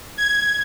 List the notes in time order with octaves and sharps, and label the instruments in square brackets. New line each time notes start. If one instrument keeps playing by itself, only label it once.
[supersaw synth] G#6